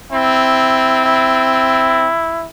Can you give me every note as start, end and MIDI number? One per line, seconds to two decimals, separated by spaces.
0.12 2.09 60
0.12 1.01 64
1.05 2.46 64